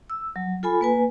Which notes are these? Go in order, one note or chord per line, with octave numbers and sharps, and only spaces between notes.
E6
F#3
F4 A4 G#5 B5
A#3 B4 G#5